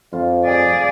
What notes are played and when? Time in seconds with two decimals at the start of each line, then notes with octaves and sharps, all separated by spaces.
0.13 F2 F4
0.45 G#4 D5